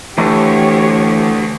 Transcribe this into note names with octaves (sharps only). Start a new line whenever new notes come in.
D2 E3 A3 D4 G4 C#5